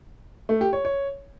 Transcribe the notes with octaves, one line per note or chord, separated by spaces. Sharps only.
A3
G4
C#5
C#5